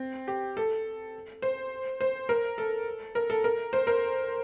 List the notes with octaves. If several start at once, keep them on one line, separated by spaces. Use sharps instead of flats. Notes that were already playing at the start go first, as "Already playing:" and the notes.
Already playing: C4
G4
A4
C5
C5
A#4
A4
A#4
A4
A#4
C5
A#4